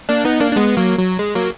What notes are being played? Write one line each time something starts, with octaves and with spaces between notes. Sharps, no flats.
A#3 D4
B3 D#4
A#3 D4
D4
G#3 B3
F#3 A#3
F#3
G#3
F#3 A#3